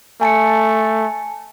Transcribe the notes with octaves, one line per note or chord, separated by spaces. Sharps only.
A3 G#5 A5 C#7